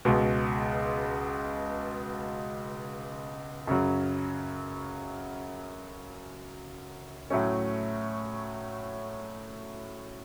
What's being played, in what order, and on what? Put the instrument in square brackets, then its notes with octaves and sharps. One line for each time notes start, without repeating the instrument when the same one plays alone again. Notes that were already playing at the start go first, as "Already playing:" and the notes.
[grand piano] C#2 B2 G#3
F#2 C#3 F#3
A2 F#3 A3 C#4